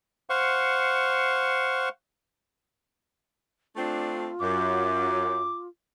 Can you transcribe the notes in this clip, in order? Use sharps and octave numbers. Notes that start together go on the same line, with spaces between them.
C5 F5 F#5 C#6
A3 C4 D4 F4
F#2 D6